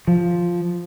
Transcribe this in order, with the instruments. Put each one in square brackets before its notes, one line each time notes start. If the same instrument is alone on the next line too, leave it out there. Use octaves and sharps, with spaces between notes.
[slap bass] F3